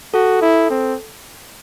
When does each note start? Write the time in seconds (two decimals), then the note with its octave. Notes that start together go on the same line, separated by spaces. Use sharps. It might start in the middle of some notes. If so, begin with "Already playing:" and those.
0.14 F#4 A4
0.42 E4
0.70 C4